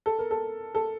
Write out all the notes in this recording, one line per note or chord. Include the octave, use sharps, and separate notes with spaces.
A4
A#4
A4
A4